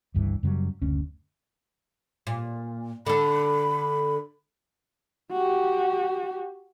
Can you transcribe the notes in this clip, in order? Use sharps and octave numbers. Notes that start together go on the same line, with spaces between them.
G1 C#2 G2 E3
F#2 C#3 F#3 G3
F#1 D2 C#4
A#2
D3 A4 B5
F#4 G4